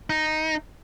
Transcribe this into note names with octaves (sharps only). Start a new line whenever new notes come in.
D#4